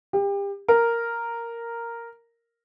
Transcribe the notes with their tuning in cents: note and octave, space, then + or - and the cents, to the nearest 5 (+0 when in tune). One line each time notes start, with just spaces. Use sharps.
G4 +30
A#4 -5